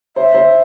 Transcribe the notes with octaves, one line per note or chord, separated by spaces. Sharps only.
C5 E5
C5